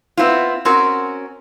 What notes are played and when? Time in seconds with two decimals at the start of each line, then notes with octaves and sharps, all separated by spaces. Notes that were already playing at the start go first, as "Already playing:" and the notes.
0.17 B3 C4 E4 F4
0.65 C4 C#4 F#4 A#4